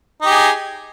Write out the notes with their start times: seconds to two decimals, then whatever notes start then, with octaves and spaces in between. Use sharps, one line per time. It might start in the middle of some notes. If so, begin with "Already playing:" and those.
0.22 D#4
0.26 G4
0.30 G#4